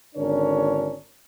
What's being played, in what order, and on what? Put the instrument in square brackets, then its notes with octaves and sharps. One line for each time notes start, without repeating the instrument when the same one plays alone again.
[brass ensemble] G#1 D3 C#4 D4 A#4 C#5